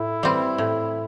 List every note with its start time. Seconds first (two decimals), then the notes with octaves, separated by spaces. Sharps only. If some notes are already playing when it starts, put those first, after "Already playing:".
Already playing: A2 E4
0.23 G3 C4
0.58 A2